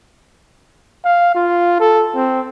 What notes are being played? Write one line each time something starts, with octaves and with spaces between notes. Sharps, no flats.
F5
F4
A4
C4